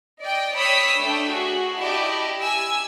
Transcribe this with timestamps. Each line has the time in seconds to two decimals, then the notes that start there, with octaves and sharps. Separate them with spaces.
0.22 D5 D#5 G5
0.56 C#5 G5 B5 D#6 E6 B6
1.00 A3 D4 G5
1.30 F#4 G#4
1.79 E4 G4 D5 D#5 A5
2.43 G#5 E6